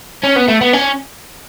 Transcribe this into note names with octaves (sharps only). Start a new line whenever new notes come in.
C#4
B3
A3
B3
C#4